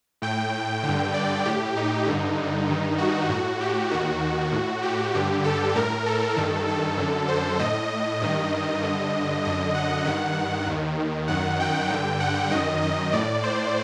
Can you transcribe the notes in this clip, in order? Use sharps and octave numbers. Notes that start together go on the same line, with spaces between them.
A2 G5
G2 D3 G5
D5
A2 G4
D#4
G2 D3
G2 D#3
F#4
A2 F#4
G4
D#2 D#3 F#4
A2
G4
G2 D3 G4
A4
A2 A#4
A4
G2 D#3
A4
F#2 D3
C5
A2 D#5
G2 D#3 D#5
G2 D3
F#2 D3 D#5
F#5
G2 D#3 F#5
D#2 D#3
F#2 D#3 F#5
G5
G2 D3 G5
F#5
F#2 D#3 D#5
D#5
A2 D5
C5